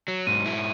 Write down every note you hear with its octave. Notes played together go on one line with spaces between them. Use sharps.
F#3
G#2 D#7
E4